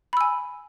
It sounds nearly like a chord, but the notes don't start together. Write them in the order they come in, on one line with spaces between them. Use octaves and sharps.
B5 E6 G#5